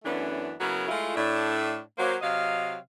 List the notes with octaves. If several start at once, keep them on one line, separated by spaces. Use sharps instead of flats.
F#2 E3 A3 B3 C#4 D4
C#3 F#3 B3 E4 A#4
G#3 A3 E4 F4
A2 D4 E5
F#3 A#3 C5
C3 F#3 D#5 F5